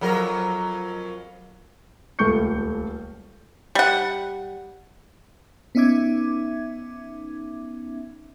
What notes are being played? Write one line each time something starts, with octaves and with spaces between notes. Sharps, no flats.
F2 F#3 A#4
D#1 C#2 A3 C#6 G6 C#7
G3 F#5
B3 C#4 D#4 E5 D6 G#6